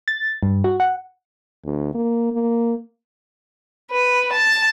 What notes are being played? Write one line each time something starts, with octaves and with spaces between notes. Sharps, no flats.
A6
G2
F#4
F#5
D2
A#3
A#3
B4
A5